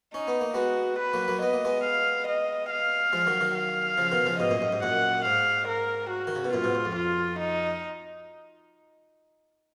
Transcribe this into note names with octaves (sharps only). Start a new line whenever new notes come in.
C#4 D#4
B3
A#3
G#3 B3 F#4
B4
F#3 A#3
F#3 A#3
B3 D#5
A#3
G#3 B3
F5
D#5
F5
F3 G#3
D#3 F#3
D#3 F#3
F5
C#3 F3
B2 D#3
C#3 F3
G#2 B2 D#5
F#2 A#2
F#2
G#2
F#2 A#2 F#5
G#2 F5
A#4
F#4
D#3
C#3
B2
F#2 A#2 F4
G#2 B2
G#2
F2
F4
D#4